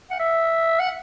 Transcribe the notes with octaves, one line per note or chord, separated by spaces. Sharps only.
F#5
E5
F#5